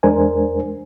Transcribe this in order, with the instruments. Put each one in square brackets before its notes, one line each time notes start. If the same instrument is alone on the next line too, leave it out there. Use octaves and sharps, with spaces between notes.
[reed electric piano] E2 G#3 D4 A#4 C5 G#5